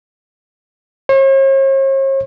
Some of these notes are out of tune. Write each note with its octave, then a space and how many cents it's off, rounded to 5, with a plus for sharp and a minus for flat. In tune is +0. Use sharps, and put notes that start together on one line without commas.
C#5 -45